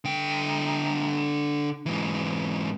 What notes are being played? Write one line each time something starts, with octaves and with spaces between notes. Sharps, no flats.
D3 G5
G#2 E3